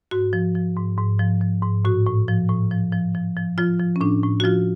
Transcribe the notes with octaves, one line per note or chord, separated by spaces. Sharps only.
G#2 F#4
F3
F3
G#2
G#2
F3
F3
G#2
A2 F#4
A2
F3
A2
F3
F3
F3
F3
F3 F4
F3
C#4
A2 D4
A2
F#4
F3 F4